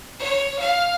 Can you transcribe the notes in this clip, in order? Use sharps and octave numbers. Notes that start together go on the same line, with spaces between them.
C#5
F5